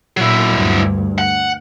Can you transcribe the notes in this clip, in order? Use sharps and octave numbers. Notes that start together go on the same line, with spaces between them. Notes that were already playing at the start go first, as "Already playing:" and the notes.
A#2 F#3 E4
D2 G2
F#5